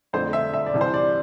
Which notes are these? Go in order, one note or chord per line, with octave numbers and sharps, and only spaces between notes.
F2 D3 A3 C5
E5
E5
D5
C2 C3 E3
C5
D5